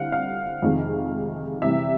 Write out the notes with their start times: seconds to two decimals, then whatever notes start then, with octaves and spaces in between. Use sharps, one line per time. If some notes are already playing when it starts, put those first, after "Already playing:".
Already playing: D3 G3 C4 E4 F5 F#5
0.12 F5
0.62 F2 C3 D#3 G#3
1.62 C3 E3 G3 E5